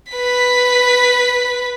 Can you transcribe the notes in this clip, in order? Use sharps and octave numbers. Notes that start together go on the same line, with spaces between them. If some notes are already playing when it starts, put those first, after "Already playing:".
B4 B6